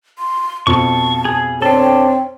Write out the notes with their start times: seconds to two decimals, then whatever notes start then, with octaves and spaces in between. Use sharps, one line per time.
0.19 C6
0.67 F2 B2 F3 A5 C#6
1.25 G#4
1.62 C4 D4 A4 C#5